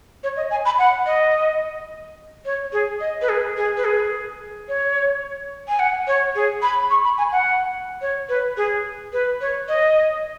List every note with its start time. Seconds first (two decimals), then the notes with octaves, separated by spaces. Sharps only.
0.24 C#5
0.37 D#5
0.51 G#5
0.65 B5
0.79 F#5
1.06 D#5
2.46 C#5
2.73 G#4
3.01 D#5
3.22 B4
3.29 G#4
3.57 G#4
3.77 B4
3.85 G#4
4.69 C#5
5.68 G#5
5.79 F#5
6.07 C#5
6.35 G#4
6.62 B5
6.90 C#6
7.04 B5
7.18 G#5
7.32 F#5
8.01 C#5
8.29 B4
8.57 G#4
9.13 B4
9.41 C#5
9.68 D#5